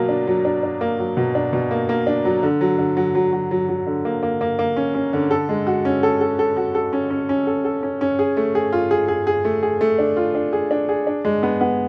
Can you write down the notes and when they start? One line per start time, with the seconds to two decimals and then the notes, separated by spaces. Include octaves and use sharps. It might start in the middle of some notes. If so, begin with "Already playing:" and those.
Already playing: B2 F#3 A#3
0.09 D4
0.27 F#3
0.45 D4
0.63 D4
0.81 A#3
0.99 F#3
1.17 B2
1.35 D4
1.53 B2
1.71 A#3
1.89 A#3
2.07 D4
2.25 F#3
2.43 D3
2.61 F#3
2.78 D3
2.97 F#3
3.15 F#3
3.33 F#3
3.51 F#3
3.69 F#3
3.87 D3
4.05 A#3
4.23 A#3
4.41 A#3
4.59 A#3
4.77 C#4
4.95 C#4
5.13 D3
5.31 A4
5.49 G#3
5.67 F#4
5.85 C#4
6.03 A4
6.21 A4
6.39 A4
6.57 F#4
6.75 A4
6.93 C#4
7.10 C#4
7.29 C#4
7.47 A4
7.65 A4
7.83 C#4
8.01 C#4
8.19 G#4
8.37 A3
8.55 G#4
8.72 F4
8.91 G#4
9.08 G#4
9.27 G#4
9.45 A3
9.63 G#4
9.81 A3
9.99 D4
10.17 F4
10.35 D4
10.53 G#4
10.71 D4
10.89 G#4
11.07 D4
11.25 G#3
11.43 B3
11.61 B3